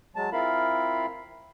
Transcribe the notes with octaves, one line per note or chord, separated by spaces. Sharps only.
F#3 G#3 A5
C4 E4 F4 A#4 F5 B5